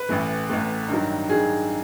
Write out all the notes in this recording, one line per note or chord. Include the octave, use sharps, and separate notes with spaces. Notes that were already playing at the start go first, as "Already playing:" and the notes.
Already playing: B4
A1 A2 E3 A3
A1 A2 E3 A3
G2 D#3 F#3
G2 D#3 F#3 G#4